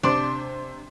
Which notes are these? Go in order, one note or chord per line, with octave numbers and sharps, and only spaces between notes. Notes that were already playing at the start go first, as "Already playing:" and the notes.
C3 D4 C5 C6